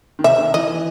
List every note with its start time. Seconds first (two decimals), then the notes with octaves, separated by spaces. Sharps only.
0.19 D#3
0.24 C3 E5
0.39 D#3
0.54 E3 D#5